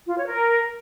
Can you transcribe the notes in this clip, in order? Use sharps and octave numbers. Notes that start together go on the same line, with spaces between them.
F4
C#5
A#4